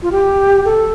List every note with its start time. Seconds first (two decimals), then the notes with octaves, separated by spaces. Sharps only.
0.02 F4
0.12 G4
0.65 A4